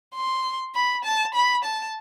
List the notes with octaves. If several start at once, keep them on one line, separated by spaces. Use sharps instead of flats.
C6
B5
A5
B5
A5